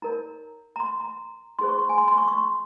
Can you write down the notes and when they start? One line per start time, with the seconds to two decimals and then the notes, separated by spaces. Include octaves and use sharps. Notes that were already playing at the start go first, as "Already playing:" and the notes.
0.02 D#4 A#4 C#5 A#5
0.76 A#5
0.80 C6
1.00 A#5
1.59 D#4 G#4 C5 C6
1.69 C#6
1.79 C6
1.89 G#5
1.98 C6
2.08 C6
2.18 C#6
2.28 C#6
2.38 C6